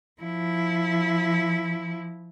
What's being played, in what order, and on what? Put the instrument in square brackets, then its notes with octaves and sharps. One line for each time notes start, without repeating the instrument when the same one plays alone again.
[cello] F3 E4